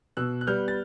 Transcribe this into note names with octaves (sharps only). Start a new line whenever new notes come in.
B2 E6 F#6
F#6
G3 B3 F6 G6
A6